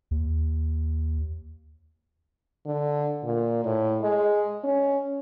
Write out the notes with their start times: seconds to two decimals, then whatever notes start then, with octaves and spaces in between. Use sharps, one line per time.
0.11 D#2
2.66 D3
3.24 A#2
3.65 A2
4.02 G#3
4.64 C#4